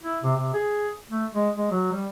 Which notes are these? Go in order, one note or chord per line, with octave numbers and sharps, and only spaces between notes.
E4
C3
C3
G#4
A3
G#3
G#3
F#3
G3